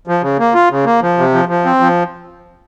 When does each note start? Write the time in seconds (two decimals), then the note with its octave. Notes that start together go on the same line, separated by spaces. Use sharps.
0.07 F3
0.23 C#3
0.39 A#3
0.54 F4
0.70 C#3
0.85 A#3
1.02 F3
1.18 C3
1.34 F3
1.49 F3
1.65 C4
1.80 F3